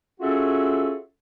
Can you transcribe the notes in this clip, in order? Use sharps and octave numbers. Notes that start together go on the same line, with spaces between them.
C#4 F4 F#4 G#4 A4 E5